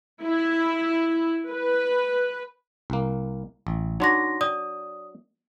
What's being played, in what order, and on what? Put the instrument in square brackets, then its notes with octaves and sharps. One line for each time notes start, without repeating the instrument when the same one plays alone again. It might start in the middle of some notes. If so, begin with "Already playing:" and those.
[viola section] E4
B4
[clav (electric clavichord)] C2 A#3
A1
[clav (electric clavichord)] F#3 D4 F#4 [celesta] D#4 C6 A#6
[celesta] D5 D#6